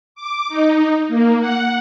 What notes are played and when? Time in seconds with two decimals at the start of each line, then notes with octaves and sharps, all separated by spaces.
0.15 D6
0.48 D#4
1.08 A#3
1.39 F#5